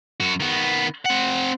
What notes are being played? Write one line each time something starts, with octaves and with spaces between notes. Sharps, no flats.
F#2 F#4
D#3 B3
C4 F#5